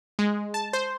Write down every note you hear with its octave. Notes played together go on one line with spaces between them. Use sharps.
G#3
A5
C5